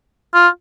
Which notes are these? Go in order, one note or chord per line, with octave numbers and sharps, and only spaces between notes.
F4